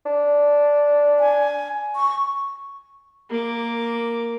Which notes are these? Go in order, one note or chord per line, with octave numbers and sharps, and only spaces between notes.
D4
G#5
C#6
A#3 D6